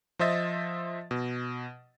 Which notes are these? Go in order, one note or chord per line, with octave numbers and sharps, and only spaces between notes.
F3 C5 D#5 E5 A6
B2